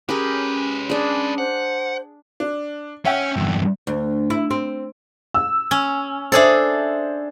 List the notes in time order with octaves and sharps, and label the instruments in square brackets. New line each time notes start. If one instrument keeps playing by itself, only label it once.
[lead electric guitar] G#3 B4 [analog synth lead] C#4 [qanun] G4 G#4 A#4
[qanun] D4 G#4 [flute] D5
[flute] C5 [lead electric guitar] F#5
[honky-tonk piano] D4
[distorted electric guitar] C#4 C#5 [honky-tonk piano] E5 F#5 G5
[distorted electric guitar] E2 G2
[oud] D2
E4
C4
[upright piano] E6
[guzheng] C#4
[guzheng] D4 G#4 A4 [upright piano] C5 E5